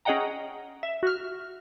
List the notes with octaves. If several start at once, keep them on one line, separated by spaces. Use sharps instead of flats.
C#4 G#4 D#5 F#5 G5 A#5
E5
F#4 F6